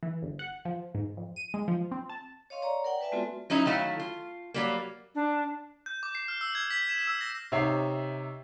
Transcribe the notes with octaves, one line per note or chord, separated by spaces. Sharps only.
E3
G1
F#5
F3
G#2
F2
D#7
G#3
F3
C4
A5
C#5 D#5 F5 C6 C#6
C#5 D5 A#5
A#4 D5 F#5 G5
B4 D5 E5 G#5 A5
G#3 B3 C4 F4 F#4 A4
F#3 C#4 D#4 E4
D#3 F#3 A3 E4 F5
F4
F#3 G3 A#3
D4
G6
D6
C7
F6
E6
G#6
B6
E7
E6
A#6
C3 D#4 C#5 E5 C7